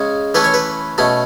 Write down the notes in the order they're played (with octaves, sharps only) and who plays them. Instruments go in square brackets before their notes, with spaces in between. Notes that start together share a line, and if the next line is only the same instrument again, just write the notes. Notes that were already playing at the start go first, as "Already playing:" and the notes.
Already playing: [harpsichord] C#3 G#3 C#4
E3 A3 C#4 B4
C#5
B4
B2 A3 C#4